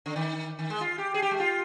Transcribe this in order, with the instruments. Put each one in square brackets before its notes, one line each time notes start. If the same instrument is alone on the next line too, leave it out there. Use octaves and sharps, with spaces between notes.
[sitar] D3
D#3
D#3
G#3
F4
G4
G#4
G4
G#3
F4